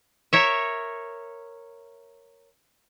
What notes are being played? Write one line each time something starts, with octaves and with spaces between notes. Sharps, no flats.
A#4 C#5 E5